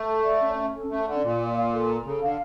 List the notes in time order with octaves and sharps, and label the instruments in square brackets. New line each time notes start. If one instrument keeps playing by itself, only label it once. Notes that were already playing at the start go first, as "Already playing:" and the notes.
Already playing: [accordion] A3
[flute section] A4
D5
C#4
C#4
A4
[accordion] A3 [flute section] C#4
[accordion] D3 [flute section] D5
[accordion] A#2 [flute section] F4
[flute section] D5
F5
A4
A#5
[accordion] C#3 [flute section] A4
[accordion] D3 [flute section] F5